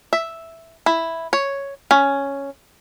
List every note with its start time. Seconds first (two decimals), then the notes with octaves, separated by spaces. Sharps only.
0.13 E5
0.86 E4
1.33 C#5
1.91 C#4